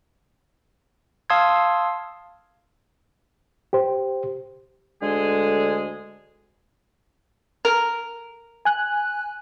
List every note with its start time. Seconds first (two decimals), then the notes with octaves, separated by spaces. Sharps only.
1.30 F5 A5 C6 D#6 E6 G#6
3.73 G4 C5
5.02 D2 D3 G#3 G#4
7.65 A#4
8.65 G#5 F#6